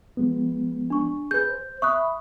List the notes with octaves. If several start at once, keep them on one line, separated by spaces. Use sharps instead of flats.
F3 G#3 B3
D4 C#6
G#4 B4 G6
C5
E5 B5 C#6 D#6 F#6